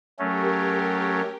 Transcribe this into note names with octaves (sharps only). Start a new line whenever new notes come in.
F#3 A3 C#4 G4 A#4